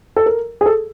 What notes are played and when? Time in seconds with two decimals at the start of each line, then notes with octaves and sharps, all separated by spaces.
0.16 A4
0.26 A#4
0.61 G#4
0.66 A4